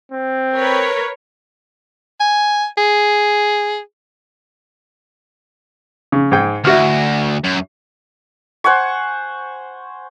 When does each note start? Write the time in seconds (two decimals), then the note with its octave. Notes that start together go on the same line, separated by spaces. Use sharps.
0.12 C4
0.57 A#4 B4 C#5
2.20 G#5
2.78 G#4
6.12 C#3
6.32 G#2 G#4 G5
6.65 D2 E4 F#4 F6
7.44 F#2
8.64 C5 F#5 G#5 C#6